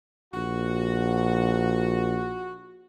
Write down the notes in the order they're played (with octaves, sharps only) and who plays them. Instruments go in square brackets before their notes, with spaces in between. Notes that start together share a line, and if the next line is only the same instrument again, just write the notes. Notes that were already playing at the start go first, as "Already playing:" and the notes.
[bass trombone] A#1 [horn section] F#4